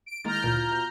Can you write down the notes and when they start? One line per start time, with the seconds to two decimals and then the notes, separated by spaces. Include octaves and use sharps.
0.06 D7
0.25 D#3 G#3 A#3 E4 A#5 F6 G6 A6
0.43 D2 A#2 F3 F4 D7
0.71 B2